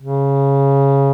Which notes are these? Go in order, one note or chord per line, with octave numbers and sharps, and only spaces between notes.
C#3